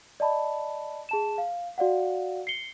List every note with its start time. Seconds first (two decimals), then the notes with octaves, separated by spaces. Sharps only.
0.20 D5 D#5 A5 B5
1.09 G#4 A5 E7
1.38 F5
1.78 F#4 D5 F5 F#5
2.47 C7 C#7 G7